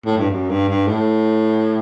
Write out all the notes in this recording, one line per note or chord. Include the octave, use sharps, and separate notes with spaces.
A2
G2
F#2
G2
G2
A2